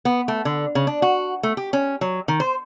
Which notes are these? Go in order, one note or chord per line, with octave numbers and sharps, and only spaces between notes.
B3
A3
D3
C#3
D4
F#4
A3
G4
C#4
F#3
D#3
C5